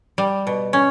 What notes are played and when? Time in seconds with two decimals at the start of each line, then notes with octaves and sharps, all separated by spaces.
0.18 G3
0.47 B2
0.73 C#4